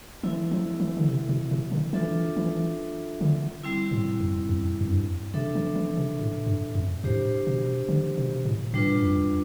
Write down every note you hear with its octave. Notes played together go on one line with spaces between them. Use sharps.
E3 C4 E4 A4 E5
F3
E3
D3
C3
B2
B2
D3
E3 D4 F4 A4 E5
E3
D3
G3 C4 E4
A2
F2
F2
F2
G2
C3 D4 A4 E5
E3
E3
C3
A2
G2
F2
A2 D4 G4 C5
B2
D3
B2
A2
A2 G3 D4 F4 B4
F2